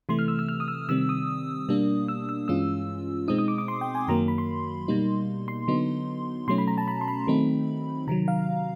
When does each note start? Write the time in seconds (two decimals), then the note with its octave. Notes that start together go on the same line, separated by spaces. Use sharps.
0.09 C3 E3 A3 C6
0.19 F6
0.28 E6
0.39 E6
0.48 F6
0.60 D#6
0.68 E6
0.89 C3 D#3 G3 C4 E6
1.09 D#6
1.69 B2 G3 A#3 D4
2.08 E6
2.29 E6
2.48 G2 E3 G#3 C#4 F4 E6
3.28 B2 G#3 C4 D#4 D#6
3.39 D#6
3.48 D6
3.58 D6
3.68 C6
3.81 G5
3.95 G#5
4.08 F#2 D#3 F#3 A#3 A#5
4.28 B5
4.38 C6
4.88 B2 G3 A#3 D#4
5.48 C6
5.68 D3 F#3 B3 D#4
6.48 B2 F#3 A3 C#4 C6
6.58 B5
6.68 A#5
6.78 A5
6.88 B5
7.01 C6
7.08 B5
7.27 D#3 F#3 A3 C4 D#4
8.07 C3 D#3 F#3 A#5
8.28 F5